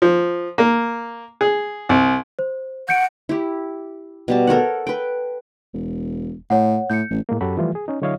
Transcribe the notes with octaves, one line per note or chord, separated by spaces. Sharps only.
F3
A#3
G#4
C2
C5
F#5 G6 C#7 D7
E4 G4
B2 G3 A5
A4 A#4 C#5 F#5
B4 G5
E1
A2 C#5 F#5
A2 G6 C#7
A1
A2 G#3 A#3
F#2 F#3 F#4 G4 A4 B5
E3 F3 G3 A3 E4 F4
G#4
C#4 D#4
D3 F#3 E4 C#5 D#5 F5